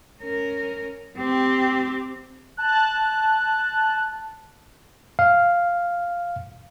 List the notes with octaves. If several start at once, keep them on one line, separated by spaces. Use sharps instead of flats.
C#4 A#4
C4 G4
A5 F#6
F5